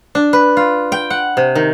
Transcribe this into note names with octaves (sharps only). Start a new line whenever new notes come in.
D4
B4
F4
G5
F#5
C3
D#3